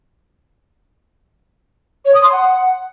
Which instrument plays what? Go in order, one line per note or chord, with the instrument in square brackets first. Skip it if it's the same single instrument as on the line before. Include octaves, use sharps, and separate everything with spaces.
[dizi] C#5
D#6
C6
F#5